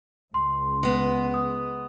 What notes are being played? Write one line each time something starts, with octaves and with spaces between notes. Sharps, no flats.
C#2 C6
G#3 B3
D#6